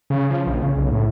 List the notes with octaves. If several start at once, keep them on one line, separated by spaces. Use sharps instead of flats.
C#3
F3
A#1
C#3
B1
A2